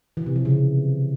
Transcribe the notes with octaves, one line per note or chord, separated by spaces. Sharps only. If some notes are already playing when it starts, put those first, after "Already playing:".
E3
C3
F3
C#3